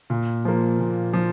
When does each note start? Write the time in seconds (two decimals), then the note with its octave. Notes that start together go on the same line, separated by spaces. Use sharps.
0.10 A#2
0.45 F3 A#3
0.79 A#2
1.13 F3